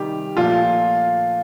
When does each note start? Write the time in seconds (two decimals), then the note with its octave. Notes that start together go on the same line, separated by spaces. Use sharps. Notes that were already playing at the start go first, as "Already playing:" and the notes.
Already playing: C3 D#3 G3 G4
0.37 A#2 F3 A3 F4